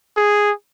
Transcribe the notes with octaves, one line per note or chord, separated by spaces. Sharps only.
G#4